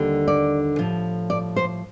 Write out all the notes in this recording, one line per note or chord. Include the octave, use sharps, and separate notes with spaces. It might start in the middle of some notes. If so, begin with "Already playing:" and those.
Already playing: D#2 D3 G3
D5
A2 F3
D5
C5